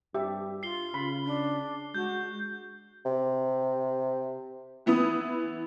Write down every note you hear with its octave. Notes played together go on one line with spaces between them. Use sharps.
G2 G4 E5 A5
F4 C7 G7
C#3 B5
D4
G#3 F#4 G6
C3
E3 B3 E4 B4 D#6